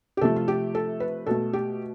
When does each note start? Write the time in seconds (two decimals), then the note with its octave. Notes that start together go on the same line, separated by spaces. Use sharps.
0.17 G4
0.21 C3 F3 A3 A4
0.36 F4
0.48 G4
0.75 A4
1.00 B4
1.26 B2 A3 A4
1.53 G4